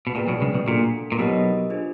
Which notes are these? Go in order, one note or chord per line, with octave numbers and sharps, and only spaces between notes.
B2
A#2 G#4 B4 D5 G5
B1 B2
C#2 C#3
B1 B2
A#2 D4 F#4 A4
A#2
B1 B2 G4 A#4 D#5
D4 F4 G#4 C5